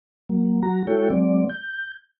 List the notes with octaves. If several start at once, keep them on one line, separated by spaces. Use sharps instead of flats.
F#3 A#3
F#3 F#4 A#5
G#3 E4 F#4 A4 C#5 G5
F#3 G#3 C4 D5
G6